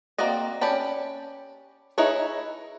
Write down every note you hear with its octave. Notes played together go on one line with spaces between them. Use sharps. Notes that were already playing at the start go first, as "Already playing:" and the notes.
A#3 C4 F#4 D5 D#5
C#4 G4 D5 A5 B5
D#4 E4 G#4 B4 C#5